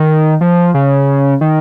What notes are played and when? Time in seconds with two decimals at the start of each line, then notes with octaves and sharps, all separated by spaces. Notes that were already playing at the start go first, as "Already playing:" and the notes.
Already playing: D#3
0.41 F3
0.74 C#3
1.41 D#3